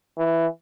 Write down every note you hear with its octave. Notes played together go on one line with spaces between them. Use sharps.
E3